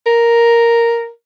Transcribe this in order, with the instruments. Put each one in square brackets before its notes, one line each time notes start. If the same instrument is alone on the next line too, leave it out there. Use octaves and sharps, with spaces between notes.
[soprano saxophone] A#4